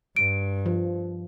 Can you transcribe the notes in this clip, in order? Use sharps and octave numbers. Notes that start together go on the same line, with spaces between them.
G2 D7
F3